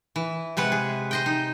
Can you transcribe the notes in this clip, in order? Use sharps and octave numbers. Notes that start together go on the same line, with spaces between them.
E3
C3 G#3 B4 F#5
G#4
C5 D#5 G5
D#4